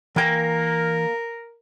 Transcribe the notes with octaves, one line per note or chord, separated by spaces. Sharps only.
E3 A#3 A#4 G5